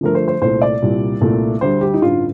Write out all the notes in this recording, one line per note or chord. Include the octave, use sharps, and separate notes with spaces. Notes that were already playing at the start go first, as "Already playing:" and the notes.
G1 G2 F3 A3 A#4
C5
C5
C2 A#2 A3 C5
D5
C2 A#2 G3
C2 A#2 A3
D2 D3 G3 C5
G4
D#4
A1 G2 D3 F4